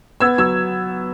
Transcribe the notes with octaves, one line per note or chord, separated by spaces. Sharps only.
B3 E6 G#6
F#3 E6 G#6